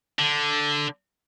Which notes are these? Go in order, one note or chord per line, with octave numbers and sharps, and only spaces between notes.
D3